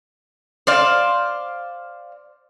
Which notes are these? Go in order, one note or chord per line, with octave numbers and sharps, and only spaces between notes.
C5 D5 F5